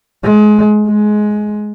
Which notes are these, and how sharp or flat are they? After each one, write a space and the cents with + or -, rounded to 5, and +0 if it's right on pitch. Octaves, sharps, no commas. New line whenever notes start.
G#3 +25
G#3 +15